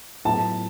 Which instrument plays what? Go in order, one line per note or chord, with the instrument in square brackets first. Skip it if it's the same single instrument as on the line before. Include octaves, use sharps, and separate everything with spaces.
[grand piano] A2 F#3 B3 F4 [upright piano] A5